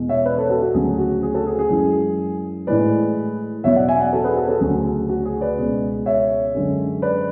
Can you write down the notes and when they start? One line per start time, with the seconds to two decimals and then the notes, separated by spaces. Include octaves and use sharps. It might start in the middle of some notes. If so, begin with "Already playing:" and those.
Already playing: E2 B2 G#3
0.09 C#5 E5
0.25 B4 D5
0.38 A4 C#5
0.50 F#4 A4
0.62 F#4
0.74 D2 C#3 F#3 G#4
0.98 F#4
1.23 G#4
1.34 F#4 A4
1.47 G#4
1.59 G#4
1.70 F#2 E3 G#3
2.67 A2 E3 G#3 B4 D5
3.64 E2 B2 F#3 C#5 E5
3.76 D5 F#5
3.88 E5 G#5
4.00 D5 F#5
4.13 F#4 A4
4.24 G#4 B4
4.36 F#4 A4
4.49 F#4 A4
4.61 D2 C#3 F#3 G#4
5.09 F#4
5.25 G#4
5.41 B4 D5
5.58 C#2 B2 G#3
6.06 C#5 E5
6.54 F#2 D3 G#3
7.02 B4 D5